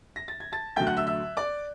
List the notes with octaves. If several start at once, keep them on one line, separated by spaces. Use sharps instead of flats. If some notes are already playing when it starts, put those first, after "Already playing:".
A#6
A6
G#6
A5 A6
D2 D3 F#3 A3 G5 G6
F#5 F#6
E5 E6
E5 E6
D5 D6